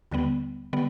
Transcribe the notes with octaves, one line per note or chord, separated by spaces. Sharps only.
D#2 D3 G3 B3
D3 G3 B3